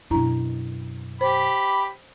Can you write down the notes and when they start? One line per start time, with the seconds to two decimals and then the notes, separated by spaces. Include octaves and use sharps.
0.10 F#2 B2 D4 E4 A#5
1.21 G4 C5 B5